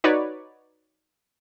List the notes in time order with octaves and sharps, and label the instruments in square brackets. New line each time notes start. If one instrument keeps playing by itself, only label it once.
[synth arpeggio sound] D#4 F#4 B4 C#5 D5